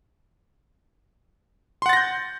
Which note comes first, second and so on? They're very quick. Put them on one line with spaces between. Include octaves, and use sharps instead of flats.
C6 F#5 A6 A#6 G6